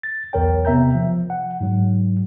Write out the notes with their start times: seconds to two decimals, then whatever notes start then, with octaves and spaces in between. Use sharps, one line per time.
0.03 A6
0.33 B1 E2 A#4 C#5 G5
0.65 C3 B3 E5 A#5 G6
0.95 F3
1.30 F#5
1.61 G#2 F#3